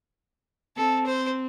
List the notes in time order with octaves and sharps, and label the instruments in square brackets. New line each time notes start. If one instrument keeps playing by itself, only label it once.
[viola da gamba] C4 [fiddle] A4
[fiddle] C5